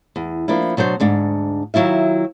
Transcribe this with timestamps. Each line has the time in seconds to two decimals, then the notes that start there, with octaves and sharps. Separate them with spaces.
0.16 E2
0.48 F3 A#3 D4 E4
0.77 B2 F#3 D4 C5
1.00 D2 G#2 D4
1.74 D#3 F#3 E4 F4 E5